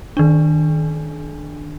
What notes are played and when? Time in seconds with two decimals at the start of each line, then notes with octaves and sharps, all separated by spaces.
0.17 D#3 D4